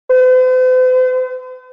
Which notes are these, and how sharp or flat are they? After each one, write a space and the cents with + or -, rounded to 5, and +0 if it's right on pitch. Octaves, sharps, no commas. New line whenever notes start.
C5 -45